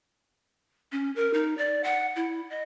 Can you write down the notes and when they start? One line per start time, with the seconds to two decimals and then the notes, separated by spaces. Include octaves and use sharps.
0.92 C#4
1.16 A#4
1.34 D#4
1.58 D5
1.84 F#5
2.16 E4
2.50 D#5